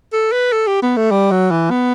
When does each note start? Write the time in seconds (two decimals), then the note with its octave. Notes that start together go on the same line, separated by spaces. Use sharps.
0.13 A4
0.32 B4
0.53 A4
0.67 G4
0.82 B3
0.97 A3
1.11 G3
1.31 F#3
1.51 E3
1.70 B3